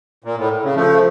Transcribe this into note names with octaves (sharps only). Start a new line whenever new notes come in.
A#2
A2
C#3
F3 A3